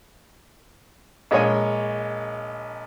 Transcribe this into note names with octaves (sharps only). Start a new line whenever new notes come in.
A#1 G#3 A#3 C#5 G#5